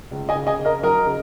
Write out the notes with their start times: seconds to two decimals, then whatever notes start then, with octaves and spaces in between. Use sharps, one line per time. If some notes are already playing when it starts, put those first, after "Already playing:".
0.11 C#2
0.29 D#5 G#5
0.35 C#3
0.47 D#5 G#5
0.59 C#3
0.65 A#4 D#5
0.83 F#3 A#4 D#5
1.06 C#3